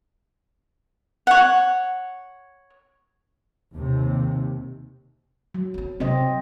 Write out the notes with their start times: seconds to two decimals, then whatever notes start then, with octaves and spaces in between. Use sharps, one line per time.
1.27 C#5 F#5
3.73 D#2 C3
5.54 F#3
5.74 B3 C4
6.00 C3 F#3 C4 D#5